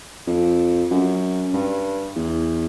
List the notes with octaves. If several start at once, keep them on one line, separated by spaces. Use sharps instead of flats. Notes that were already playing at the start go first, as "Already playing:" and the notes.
F2
F#2
G2
E2